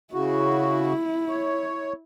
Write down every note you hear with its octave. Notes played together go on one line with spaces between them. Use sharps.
C#3 E4 F#4
C#5